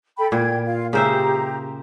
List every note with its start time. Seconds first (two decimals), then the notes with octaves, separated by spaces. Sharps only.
0.18 A4 G5 B5
0.32 A#2 G5 G#6
0.67 F4 F5
0.93 C#3 G4 C5 E5 A#5